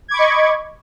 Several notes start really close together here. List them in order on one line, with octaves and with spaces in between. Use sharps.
G#6 D6 B5 C#6 D#5